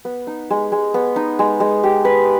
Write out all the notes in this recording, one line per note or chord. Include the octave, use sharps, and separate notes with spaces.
B3
D#4
G#3
G#3
B3
D#4
G#3
G#3
G4
B4